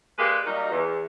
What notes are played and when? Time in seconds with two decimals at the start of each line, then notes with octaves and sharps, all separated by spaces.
0.19 G#3 A#3 G4 B4 D5
0.46 F#3 G3 A#3 D#4
0.71 E2